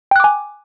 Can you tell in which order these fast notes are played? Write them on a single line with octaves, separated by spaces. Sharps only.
G5 F#6 D6 G#5